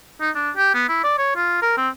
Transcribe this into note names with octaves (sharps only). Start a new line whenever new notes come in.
D#4
D4
G4
B3
E4
D5
C#5
F4
A#4
C4